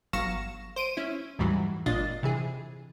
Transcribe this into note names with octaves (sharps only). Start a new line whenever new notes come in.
G1 F#3 F5 C#6 A#6 E7
C5 D7 D#7
C#4 E4
D#2 G#2 E3 F#3 G3
G#1 A#2 D4 F4 D#5 A6
C3 E3 G#4